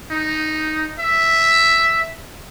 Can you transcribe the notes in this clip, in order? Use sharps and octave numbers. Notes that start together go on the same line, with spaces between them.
D#4
E5